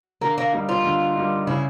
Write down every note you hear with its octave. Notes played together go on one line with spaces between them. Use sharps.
D3 A#3
A#3
G3 A#3 D#4
F4
D3
G3 A#3 D#4
C#3 E4